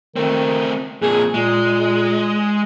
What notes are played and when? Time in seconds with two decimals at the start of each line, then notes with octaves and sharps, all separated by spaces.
0.16 D#3 A3 C4
1.02 F2 A#2 G#4
1.34 A#2 G#3